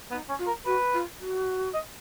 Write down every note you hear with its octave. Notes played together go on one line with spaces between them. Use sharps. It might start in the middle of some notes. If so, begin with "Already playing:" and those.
B3 D#4
C#4
F4
A#4
F#4 B4
F4
F#4
D#5